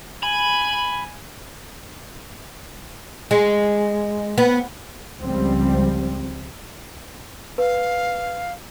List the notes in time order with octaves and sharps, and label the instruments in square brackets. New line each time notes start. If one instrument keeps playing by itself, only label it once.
[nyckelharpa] G#5 [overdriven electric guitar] B5
[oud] G#3
B3
[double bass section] C#2 F3 G3 C4
[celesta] B4 [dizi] F5